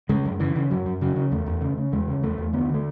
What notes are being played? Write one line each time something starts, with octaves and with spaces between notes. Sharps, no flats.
C#3 G#3
F#2
C#3 E3
C#3
F#2 F#3
F#2
C#3 F#3
C#3
E2 A3
E2
C#3
C#3
E2 G#3
C#3
E2 A3
E2
D2 B3
D3 A3